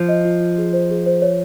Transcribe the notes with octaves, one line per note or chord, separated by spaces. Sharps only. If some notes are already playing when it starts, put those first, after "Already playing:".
Already playing: F3 C5
D#5
F4
F4
G#4
C5
G#4
C5
C#5